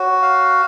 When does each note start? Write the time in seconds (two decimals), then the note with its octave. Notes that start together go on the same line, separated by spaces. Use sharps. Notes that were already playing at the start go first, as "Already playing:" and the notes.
Already playing: F#4 C#5
0.22 F5